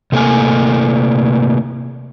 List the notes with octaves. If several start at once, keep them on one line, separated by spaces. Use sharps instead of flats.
C3 A3 A#3 G#5